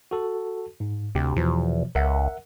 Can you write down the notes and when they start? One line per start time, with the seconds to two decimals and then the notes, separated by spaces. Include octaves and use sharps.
0.11 F#4 A4
0.80 G#2
1.15 D2 C3 G4
1.37 E2 B2 E3 F3
1.95 C#2 A#4 E5 F#5